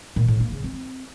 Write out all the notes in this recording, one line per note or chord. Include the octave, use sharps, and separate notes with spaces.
A#2
A2
A#3
C#3
C4